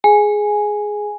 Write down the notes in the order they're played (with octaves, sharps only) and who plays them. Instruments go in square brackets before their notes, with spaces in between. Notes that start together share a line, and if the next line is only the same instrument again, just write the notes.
[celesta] G#4 [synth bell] G#5